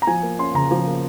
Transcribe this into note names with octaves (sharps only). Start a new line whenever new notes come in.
A#5
F3 G#5
A#3
C#4 C6
C#3 A#5
F3
A#3